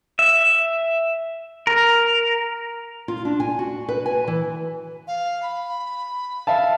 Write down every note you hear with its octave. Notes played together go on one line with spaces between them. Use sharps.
E5
A#4
F4
D4
G#5
F#4
B4
G#5
E3
F5
B5
E5 F5 A5